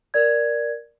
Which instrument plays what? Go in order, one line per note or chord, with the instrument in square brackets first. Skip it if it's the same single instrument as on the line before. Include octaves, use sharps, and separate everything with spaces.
[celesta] A#4 D5 G#6